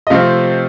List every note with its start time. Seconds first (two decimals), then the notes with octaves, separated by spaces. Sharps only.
0.07 D#5
0.10 C3 F3 A3 C4 F5